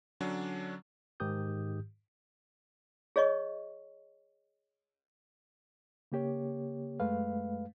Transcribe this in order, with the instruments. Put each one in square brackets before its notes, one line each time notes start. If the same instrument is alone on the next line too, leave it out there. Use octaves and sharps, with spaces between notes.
[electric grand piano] D3 F#3 C#4 D4
[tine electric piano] G#2 D#3 G4 D#6 G6
[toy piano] G#4 C#5 D#5 C#6
[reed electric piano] C#3 A#3 G4 C#5
F#2 G#3 A3 B4 F5